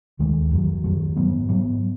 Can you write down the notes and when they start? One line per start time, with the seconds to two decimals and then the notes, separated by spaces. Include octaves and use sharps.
0.19 D#2 D#3 G#3
0.51 F#2 D#3 F#3
0.84 F#2 D#3 F#3
1.16 G#2 F#3 B3
1.49 G#2 F#3 B3